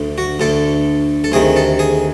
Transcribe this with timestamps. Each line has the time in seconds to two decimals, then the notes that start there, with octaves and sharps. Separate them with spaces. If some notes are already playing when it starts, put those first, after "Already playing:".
Already playing: D2 D3
0.18 F#4
0.40 D2 D3 A4
1.24 A4
1.32 D2 C3 D#3 G#4
1.56 A4
1.79 G#4